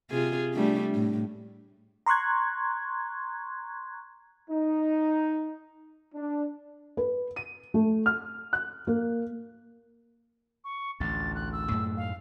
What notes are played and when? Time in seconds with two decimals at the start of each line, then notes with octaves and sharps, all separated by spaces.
0.11 C3 F4 G#4
0.54 G3 A3 D4
0.95 A2
2.06 A#5 C6 C#6 F#6 G#6
4.51 D#4
6.14 D4
6.97 B4
7.36 D#7
7.74 A3
8.06 F6
8.53 F#6
8.87 A#3
10.64 C#6
11.00 A1 D2 A6
11.35 F#6
11.52 E6
11.71 F#2 A2 A3
11.97 F5